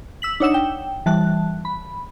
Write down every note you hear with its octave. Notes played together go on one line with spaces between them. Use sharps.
E6 B6 F#7
D4 D#4 C#5 F#5 E6 E7
G5
E3 G3 A5 F#6
B5